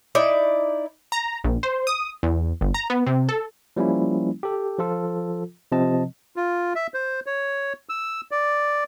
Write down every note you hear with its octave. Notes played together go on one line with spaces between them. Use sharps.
D#4 E4 D5
A#5
A#1
C5
D#6
E2
G1
A#5
B3
C3
A4
F3 G3 A#3 C#4 E4
G4 A4
F3 F4 A4
C3 F3 C4 D#5 A5
F4
E5
C5
C#5
E6
D5